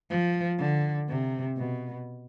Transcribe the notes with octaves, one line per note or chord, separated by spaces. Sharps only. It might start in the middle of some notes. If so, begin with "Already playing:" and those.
F3
D3
C3
B2